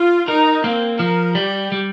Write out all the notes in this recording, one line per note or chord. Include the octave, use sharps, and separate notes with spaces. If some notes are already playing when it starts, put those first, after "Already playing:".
Already playing: F4
D#4 A#4
A#3 C4
F3 A#4
G3 G4
G3